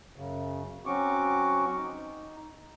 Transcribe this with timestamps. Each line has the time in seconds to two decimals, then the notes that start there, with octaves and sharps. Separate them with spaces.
0.16 F#2 C#3
0.86 F#3 C4 C#4 F#4 C#6 D6
1.77 D#4